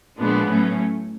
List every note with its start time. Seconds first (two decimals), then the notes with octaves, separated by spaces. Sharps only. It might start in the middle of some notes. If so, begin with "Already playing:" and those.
0.19 A#2 F3 G#3 B3 D4
0.49 A2 F#3 A3 C#4